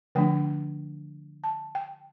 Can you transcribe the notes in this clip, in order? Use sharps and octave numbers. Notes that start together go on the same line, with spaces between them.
D3 F3 A3 D4 G5
A5
G5